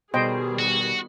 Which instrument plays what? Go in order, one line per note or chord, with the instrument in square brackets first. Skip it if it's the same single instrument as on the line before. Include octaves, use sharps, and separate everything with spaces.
[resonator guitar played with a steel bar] B2 [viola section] D#3 G3 G#4 [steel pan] C5 D#5 G5
[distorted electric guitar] F#4